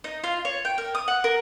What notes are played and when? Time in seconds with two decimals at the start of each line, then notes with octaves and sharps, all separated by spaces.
0.04 D#4
0.24 F4
0.45 C#5
0.65 G5
0.78 A#4
0.95 D#6
1.08 F#5
1.24 A#4